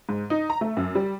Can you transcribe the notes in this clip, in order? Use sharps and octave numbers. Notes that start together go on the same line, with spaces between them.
G#2
D#4
A#5
A3
F#2
G3